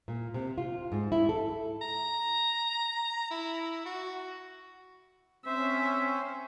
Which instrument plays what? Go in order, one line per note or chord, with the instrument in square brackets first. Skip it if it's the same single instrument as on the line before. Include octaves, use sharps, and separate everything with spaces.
[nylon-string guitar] A#2
C3
F4
G#2
E4
A4
[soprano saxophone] A#5
E4
F#4
[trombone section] C4 [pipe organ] C#4 [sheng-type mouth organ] C5 [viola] E5